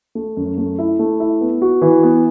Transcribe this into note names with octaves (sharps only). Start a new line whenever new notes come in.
A3
F#2
A3
E4
A3
E4
B3
F#4
E3
B3